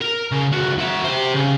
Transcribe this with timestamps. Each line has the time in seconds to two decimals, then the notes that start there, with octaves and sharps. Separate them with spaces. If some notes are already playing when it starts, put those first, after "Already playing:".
0.01 A#4
0.31 C#3
0.52 C#2 F#4
0.79 F#4 E5
1.05 G4 C5
1.35 C#3